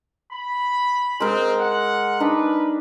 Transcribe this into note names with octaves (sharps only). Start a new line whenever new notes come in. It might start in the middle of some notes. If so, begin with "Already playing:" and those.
B5
G#3 C4 A#4
F#5
D4 D#4 B4